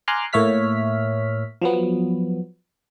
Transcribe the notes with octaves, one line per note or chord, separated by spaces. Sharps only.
G#5 A#5 C6 D6 F6 F#6
A2 A#3 C#5 E5 F6 B6
F3 F#3 B3